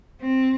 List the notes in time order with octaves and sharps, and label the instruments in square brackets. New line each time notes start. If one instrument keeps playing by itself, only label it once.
[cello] C4